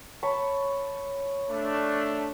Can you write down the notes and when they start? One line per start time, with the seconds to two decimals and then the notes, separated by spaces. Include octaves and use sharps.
0.23 C#5 A5 B5
1.49 A3 D4